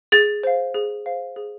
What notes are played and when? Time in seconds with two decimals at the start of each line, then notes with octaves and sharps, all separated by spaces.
0.12 G#4 A6
0.43 C5 F5
0.74 G#4
1.06 C5 F5
1.36 G#4